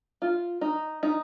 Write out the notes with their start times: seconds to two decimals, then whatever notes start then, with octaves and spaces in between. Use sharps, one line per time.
0.22 F4
0.61 D#4
1.03 D#4